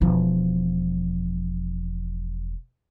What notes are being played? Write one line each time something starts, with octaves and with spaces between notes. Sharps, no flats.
E1 F3